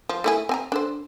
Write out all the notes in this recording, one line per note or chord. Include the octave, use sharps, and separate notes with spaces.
F3
A3 E4 G#4
C4 G#5 A#5
D4 A4 C5